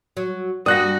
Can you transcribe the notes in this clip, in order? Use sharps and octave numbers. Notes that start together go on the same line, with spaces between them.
F#3
G2 G3 A#3 F#4 D#6 F#6 A#6